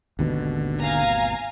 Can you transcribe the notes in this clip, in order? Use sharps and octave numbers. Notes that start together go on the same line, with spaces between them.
G#1 D#2 B2 D3
F5 G#5 A#5